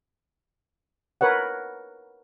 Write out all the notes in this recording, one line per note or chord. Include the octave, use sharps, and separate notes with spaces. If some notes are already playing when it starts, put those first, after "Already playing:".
A#4 B4 C#5 F#5